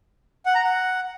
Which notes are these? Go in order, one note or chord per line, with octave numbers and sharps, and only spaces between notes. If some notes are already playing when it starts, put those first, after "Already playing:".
F#5
A#5
F#5